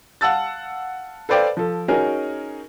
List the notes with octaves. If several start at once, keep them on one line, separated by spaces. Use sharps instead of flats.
F5 F#5 A5 E6 A6
A4 B4 C5 D5 F5 G5
F3 A4
C#4 D#4 F#4 G#4 A#4